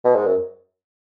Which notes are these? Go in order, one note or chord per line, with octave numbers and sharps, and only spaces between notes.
B2
G#2
F#2